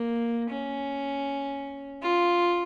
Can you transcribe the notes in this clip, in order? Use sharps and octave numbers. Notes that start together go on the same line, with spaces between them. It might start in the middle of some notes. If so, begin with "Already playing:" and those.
Already playing: A#3
C#4
F4